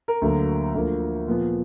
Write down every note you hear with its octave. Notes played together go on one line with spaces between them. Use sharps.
A#4
D2 D3 F#3 A#3
D2 D3 F3 A#3
A#2 F3 B3